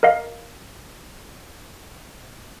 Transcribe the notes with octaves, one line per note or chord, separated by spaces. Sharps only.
A#4 D#5 F5